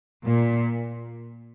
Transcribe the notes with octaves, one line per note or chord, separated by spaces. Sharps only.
A#2